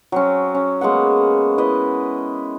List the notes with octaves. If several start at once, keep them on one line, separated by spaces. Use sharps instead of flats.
F#3 C4 C#4
C#4
G#3 A#3 B3 F#5
E4 B4 D#5